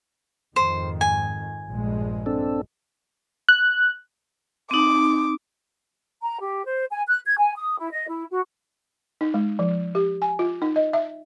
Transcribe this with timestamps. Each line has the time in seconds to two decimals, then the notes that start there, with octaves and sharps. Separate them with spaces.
0.56 F2 G#2 D#3 C5
1.01 G#5
1.69 A#1 G2 G#3
2.26 C4 D4 A4
3.49 F#6
4.71 C4 D#4 D6
6.22 A#5
6.41 G4
6.65 C5
6.91 G#5
7.08 F#6
7.26 G#6
7.38 G#5
7.57 D#6
7.78 E4
7.92 D#5
8.09 E4
8.30 F#4
9.21 D#4
9.34 G#3
9.59 F3
9.95 G4
10.22 G#5
10.39 F4
10.62 D#4
10.76 D#5
10.93 E5